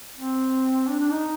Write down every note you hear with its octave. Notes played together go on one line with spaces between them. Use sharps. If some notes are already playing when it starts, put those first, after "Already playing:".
C4
D4
D4
D#4